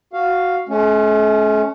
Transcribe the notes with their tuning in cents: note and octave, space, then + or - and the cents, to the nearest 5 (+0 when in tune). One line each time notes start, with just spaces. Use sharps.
F#4 +0 F5 +0
A3 -45 C#4 +0